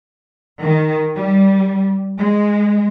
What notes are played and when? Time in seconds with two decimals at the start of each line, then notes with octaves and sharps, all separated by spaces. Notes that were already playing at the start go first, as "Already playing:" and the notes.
0.62 D#3
1.17 G3
2.21 G#3